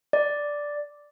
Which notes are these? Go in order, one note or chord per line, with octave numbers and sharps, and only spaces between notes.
D5